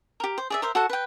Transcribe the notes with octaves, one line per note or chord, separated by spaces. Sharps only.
G4 A#4
C5
G#4 D5 E5
A#4 C5 E5
F#4 A4 F#5
B4 G5